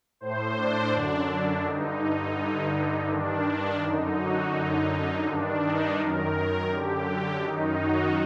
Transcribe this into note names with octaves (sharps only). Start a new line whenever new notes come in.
A2 C5
D4
F#2 D3
G2 D3 D#4
D#4
G2 D3
G2 D#3 D4
F#2 D3 D#4
F#4
F#2 D3 D#4
G2 D#3 D4
D#4
F#2 D#3 A#4
F#2 D3 G4
F#2 D#3 D#4
F#4